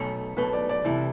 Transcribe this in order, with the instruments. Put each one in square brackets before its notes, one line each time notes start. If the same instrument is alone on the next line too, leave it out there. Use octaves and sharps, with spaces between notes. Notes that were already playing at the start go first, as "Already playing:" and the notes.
Already playing: [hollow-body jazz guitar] B1 B2 A3
[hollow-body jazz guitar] B1 B2 A3 [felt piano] B4
[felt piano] D5
D5
[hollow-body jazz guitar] C2 C3 E3 A3 [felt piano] E4